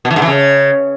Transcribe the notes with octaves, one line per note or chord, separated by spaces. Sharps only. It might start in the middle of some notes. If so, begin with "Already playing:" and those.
B2
E3
G#2
E3
C#3